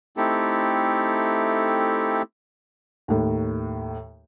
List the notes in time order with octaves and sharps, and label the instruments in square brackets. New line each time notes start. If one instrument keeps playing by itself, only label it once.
[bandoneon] A3 C4 D#4 E4 G4 A4
[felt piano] D#2 A2